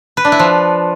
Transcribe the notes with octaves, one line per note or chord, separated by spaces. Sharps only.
B4
D4
E4
F3